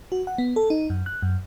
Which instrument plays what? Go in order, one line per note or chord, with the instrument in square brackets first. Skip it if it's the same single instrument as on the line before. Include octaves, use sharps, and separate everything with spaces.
[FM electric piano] F#4
F#5
B3
A4
D#4
F#2
F#6
F#2